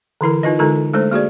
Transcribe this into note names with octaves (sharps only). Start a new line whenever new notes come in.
D3 E3 E4 A#4
D#4 F4 B4 D#5
D3 G#3 D#4 F4 A4 A#4
G#3 A3 D4 A4 C5
A#3 F#4 G#4 D5